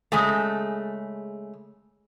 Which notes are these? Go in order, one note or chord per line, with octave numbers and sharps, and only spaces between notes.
C#3 G#3 A3